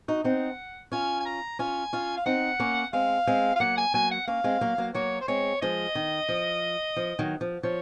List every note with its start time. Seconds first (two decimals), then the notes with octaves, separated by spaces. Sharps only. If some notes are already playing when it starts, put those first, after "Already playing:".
0.08 D#4 F#4
0.24 C4 D#4 F#5
0.92 C#4 F4 G#5
1.20 G#5
1.26 A#5
1.59 C#4 F4 G#5
1.93 C#4 F4
2.17 F5
2.26 C4 D#4 F#5
2.60 A#3 C#4
2.93 G#3 C4 F5
3.27 G#3 C4
3.56 F5
3.60 F#3 A#3 F#5
3.77 G#5
3.94 F#3 A#3 G#5
4.11 F#5
4.27 A#3 C#4 F5
4.44 G#3 C4
4.61 F#3 A#3
4.78 F#3 A#3
4.95 F#3 A#3 C#5
5.21 C5
5.28 G#3 C4 C#5
5.62 F3 G#3 D#5
5.95 D#3
6.29 F3
6.96 F3
7.19 D#3 F#3
7.41 F3
7.63 F3 C#5